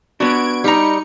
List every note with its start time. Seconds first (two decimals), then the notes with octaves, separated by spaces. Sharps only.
0.20 B3 D4 F#4 G#6 D7
0.64 G3 D#4 A#5 C#7